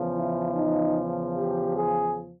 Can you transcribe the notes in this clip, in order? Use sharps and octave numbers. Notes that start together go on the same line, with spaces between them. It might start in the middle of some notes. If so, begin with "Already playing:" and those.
Already playing: E2 C#3 F3
E4
D#4
G4
G#4